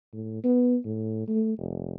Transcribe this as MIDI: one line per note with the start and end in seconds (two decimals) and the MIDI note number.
0.13 0.41 45
0.44 0.76 59
0.85 1.23 45
1.28 1.55 57
1.58 1.95 29